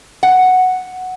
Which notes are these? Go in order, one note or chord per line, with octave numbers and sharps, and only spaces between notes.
F#5